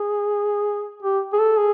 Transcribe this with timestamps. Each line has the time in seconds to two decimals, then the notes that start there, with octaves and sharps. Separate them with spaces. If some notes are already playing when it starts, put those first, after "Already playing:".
Already playing: G#4
1.03 G4
1.33 G#4
1.39 A4
1.57 G#4